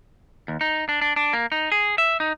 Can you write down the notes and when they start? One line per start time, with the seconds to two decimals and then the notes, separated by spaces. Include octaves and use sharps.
0.48 D#2
0.61 D#4
0.89 D4
1.01 D4
1.16 D4
1.33 A#3
1.52 D#4
1.72 G#4
1.98 E5
2.20 D#4